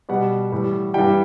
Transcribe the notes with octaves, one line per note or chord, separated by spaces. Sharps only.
B2 G3 F#5
A2 E3 G3
G2 E3 G3 G5